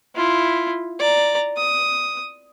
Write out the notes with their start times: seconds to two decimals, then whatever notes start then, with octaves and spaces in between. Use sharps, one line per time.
0.15 E4 F4
1.00 D5 A#5
1.57 D#6